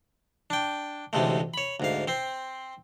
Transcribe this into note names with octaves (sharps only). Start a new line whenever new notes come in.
D4 G5
A1 D2 C3 G#3 A3
C#5 B5
D2 G#2 F5
C4 C5